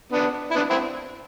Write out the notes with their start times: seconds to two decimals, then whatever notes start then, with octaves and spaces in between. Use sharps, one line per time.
0.12 B3 D4
0.51 E4
0.55 B3 D4
0.70 C4 E4